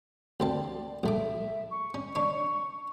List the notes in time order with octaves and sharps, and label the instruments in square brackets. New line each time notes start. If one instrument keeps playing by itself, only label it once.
[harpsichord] D2 C4 A5 [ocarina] D5
[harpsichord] A#1 A3 D6 [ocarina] E5
[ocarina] C#6
[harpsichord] C#4
D4 C#5